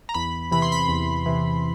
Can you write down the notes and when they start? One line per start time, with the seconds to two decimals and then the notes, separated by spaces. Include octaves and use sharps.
0.09 A#5
0.14 E2 B5
0.51 C3 E3 B5
0.62 C6
0.72 B5
0.89 E2
1.26 C3 E3